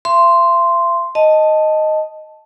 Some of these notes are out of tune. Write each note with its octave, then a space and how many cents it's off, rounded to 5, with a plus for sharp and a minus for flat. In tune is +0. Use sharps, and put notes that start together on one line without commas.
E5 +45 C6 -5
D#5 +0 A5 +0